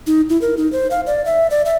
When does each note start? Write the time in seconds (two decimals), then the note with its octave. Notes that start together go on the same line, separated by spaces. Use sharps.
0.07 D#4
0.29 E4
0.41 A#4
0.57 D#4
0.72 C5
0.91 F5
1.07 D5
1.26 E5
1.51 D5
1.66 E5